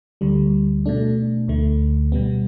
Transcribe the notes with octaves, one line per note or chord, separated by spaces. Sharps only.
D2 D3 G3
B2 A3 D4
D2 D3 A3
B2 G3 B3